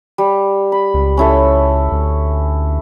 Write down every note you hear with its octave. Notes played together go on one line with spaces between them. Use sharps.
G3
B5
C#2
C#4 E4 A4
D2